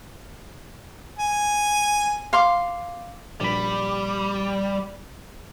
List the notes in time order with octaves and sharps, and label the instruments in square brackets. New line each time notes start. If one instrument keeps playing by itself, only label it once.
[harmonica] G#5
[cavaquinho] F5 C6 D6
[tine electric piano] A#1 B5 [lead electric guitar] G3